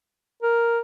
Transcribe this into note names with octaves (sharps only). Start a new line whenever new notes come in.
A#4